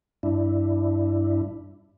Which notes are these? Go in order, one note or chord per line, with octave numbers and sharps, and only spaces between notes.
G2 D4 E4